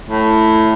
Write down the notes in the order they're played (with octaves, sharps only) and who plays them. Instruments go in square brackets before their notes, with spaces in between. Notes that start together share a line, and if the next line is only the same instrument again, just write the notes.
[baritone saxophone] A2